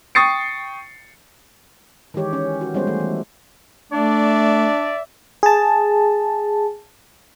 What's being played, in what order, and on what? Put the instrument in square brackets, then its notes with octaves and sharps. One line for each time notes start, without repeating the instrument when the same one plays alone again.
[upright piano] G5 C#6 D#6 A6 C7 C#7
[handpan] D#3 E3 G#3 G4 C#5
C#4
F#4
G3 G#3 B3 C#4 E4 C5
E3 A3
E3
[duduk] A3 [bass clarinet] D4 [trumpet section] D5 E5
[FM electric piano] G#4 A5